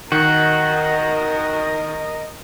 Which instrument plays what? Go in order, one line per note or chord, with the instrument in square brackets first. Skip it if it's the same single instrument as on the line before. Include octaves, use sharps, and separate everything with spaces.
[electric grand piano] D#3 [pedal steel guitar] F#4 [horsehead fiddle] A#4 D#5